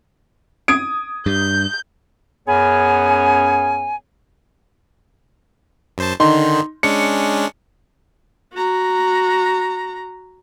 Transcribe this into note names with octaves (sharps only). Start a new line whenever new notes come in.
D#6 G#6 D7
G2 G6
F#2 B3 C#4 G#4 C#5 G#5
F#2 C5 A5
D3 D#3 D#4 C6
G#3 C#4 D4 C#7
F#4 A#5